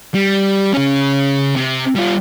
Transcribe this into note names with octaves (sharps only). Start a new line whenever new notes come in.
G3
C#3 C#4
C3
G3 F4